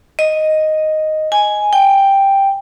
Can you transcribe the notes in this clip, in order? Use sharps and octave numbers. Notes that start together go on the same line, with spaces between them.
D#5
G#5
G5